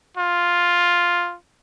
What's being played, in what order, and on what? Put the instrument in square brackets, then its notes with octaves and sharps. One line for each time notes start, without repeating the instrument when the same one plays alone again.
[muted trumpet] F4